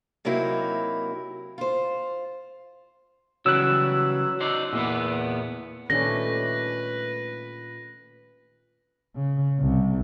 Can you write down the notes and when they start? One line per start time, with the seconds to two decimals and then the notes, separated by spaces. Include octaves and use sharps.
0.25 C3 F#3 A#3 D#4 E4
1.58 F4 C5
3.46 C#3 E3 F#3 G3 E6 F#6
4.41 D#4 C5 D5
4.73 E2 A#2 A#3 B3
5.90 A#2 D#3 G3 A3 C#4 D4 B4 A#6
9.16 C#3
9.59 C2